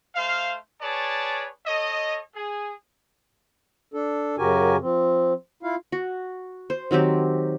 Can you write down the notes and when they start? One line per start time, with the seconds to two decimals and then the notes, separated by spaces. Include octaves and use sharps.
0.15 A3 C5 F5
0.81 G#4 B4 C#5 D5 A5
1.66 A4 C#5 D#5
2.35 G#4
3.94 D4 A4
4.38 F#2 C#3 F#4 G4 A#4 G#5
4.81 F3 C4
5.63 E4 F4 F5
5.92 F#4
6.70 C5
6.91 D#3 F#3 C4 G4